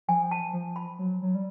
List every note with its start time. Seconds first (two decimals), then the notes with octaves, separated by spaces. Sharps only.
0.08 F3 G#5
0.31 A5
0.53 F3
0.76 B5
0.99 F#3
1.22 F#3
1.35 G3